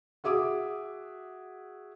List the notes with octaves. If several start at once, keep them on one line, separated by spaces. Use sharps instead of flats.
F#4 G#4 E5 D6 D#6